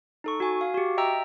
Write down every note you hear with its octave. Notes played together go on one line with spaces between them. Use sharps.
D#4 A4 C#6
F#4 G#5
F5
F#4 G4
D#5 E5 G5 A#5 E6